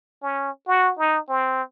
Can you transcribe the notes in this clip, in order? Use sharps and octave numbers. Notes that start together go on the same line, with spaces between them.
C#4
F#4
D#4
C4